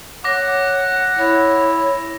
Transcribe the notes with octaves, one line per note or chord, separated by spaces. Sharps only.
C#5 F#5 D6 A#6
E4 C#5